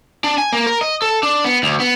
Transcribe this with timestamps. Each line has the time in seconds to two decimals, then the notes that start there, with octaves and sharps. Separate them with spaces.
0.24 D4
0.38 G#5
0.53 A#3
0.67 A#4
0.81 D#5
1.02 A4
1.23 D4
1.44 B3
1.63 D2
1.80 B3